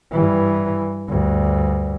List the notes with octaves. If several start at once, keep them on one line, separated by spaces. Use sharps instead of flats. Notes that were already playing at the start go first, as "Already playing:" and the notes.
G2 E3
D2 G2